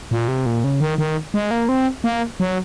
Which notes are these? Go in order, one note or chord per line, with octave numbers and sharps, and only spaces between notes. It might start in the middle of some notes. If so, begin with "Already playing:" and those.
A#2
C3
A#2
C#3
D#3
D#3
G#3
A#3
C4
A#3
F#3